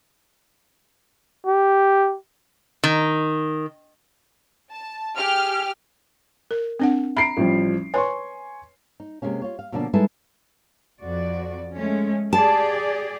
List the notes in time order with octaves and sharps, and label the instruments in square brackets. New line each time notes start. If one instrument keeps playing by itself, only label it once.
[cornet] G4
[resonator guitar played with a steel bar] D#3
[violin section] A5
G4 G#4 F6
[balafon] A#4
C4 D4 F#5
[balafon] E5 B5 [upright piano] A#5 C7 D7
[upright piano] A1 F3 G3
[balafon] B4 C#5 [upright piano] G#5 C6 C#6
[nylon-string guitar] D#4
C3 G#3 A#3 C#4
F4 C#5
F5
B2 D3 F3 A#3 C#4 D4
G3 G#3 D#4 E4 A4 B4
[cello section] F2 F#4 D5
G#3 A3 C#4
[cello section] G4 G#4 D5 [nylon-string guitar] A5